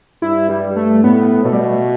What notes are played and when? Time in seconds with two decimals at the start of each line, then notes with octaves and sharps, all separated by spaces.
0.22 G2 E4
0.49 G3
0.76 A3
1.04 A2 B3
1.45 B2 A3
1.53 G3
1.61 A3